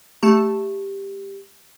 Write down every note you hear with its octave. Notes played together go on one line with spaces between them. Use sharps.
A3 G4 A5